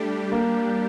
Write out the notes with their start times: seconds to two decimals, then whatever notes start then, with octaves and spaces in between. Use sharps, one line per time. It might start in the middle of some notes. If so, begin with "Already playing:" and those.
Already playing: G3 A3 D4 G4
0.32 A#3